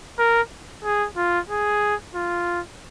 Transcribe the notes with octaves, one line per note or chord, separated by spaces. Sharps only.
A#4
G#4
F4
G#4
F4